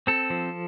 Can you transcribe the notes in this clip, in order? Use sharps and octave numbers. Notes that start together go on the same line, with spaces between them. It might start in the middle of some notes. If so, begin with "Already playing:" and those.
C4 A4
F3